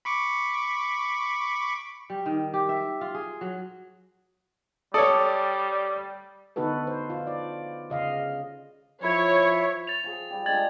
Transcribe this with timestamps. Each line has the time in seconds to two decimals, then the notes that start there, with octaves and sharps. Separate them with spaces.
0.05 B5 C#6 D6
2.10 G3
2.26 D#3
2.53 G4
2.69 E5
3.01 F4
3.15 G#4
3.41 F#3
4.94 G3 A4 C#5 D5 D#6
6.56 D3 B3 D#4 F#4 A4 B4
6.87 C5
7.10 F4
7.27 D5
7.90 C#3 D#5 F5
9.03 F3 E4 C#5
9.87 A6 F7
10.04 F3 G#4
10.30 F3 G3 G4
10.46 G#3 D4 F4 G#6 A6 F#7